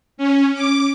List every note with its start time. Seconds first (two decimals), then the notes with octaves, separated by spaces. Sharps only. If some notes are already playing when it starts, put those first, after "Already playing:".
0.17 C#4
0.54 D6